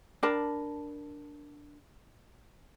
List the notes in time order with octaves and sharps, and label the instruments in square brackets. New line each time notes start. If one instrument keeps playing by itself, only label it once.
[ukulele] D4 A#4 A5 B5